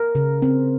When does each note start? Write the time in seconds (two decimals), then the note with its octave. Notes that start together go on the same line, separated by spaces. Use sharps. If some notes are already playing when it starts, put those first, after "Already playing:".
Already playing: A#4
0.15 C#3
0.42 C4